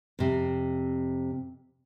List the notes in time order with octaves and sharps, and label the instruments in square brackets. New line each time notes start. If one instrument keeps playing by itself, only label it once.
[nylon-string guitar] F2 C3